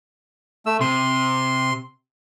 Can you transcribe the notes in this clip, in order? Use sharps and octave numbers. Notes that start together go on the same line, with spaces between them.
A3 E6
C3 C6